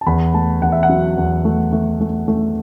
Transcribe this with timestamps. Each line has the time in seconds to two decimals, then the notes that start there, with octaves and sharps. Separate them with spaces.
0.01 A5
0.07 E2 B5
0.34 A3 A5
0.62 E2 F#5
0.72 E5
0.83 F#5
0.89 F#3
1.17 E2
1.45 A3
1.73 A3
2.01 A3
2.28 A3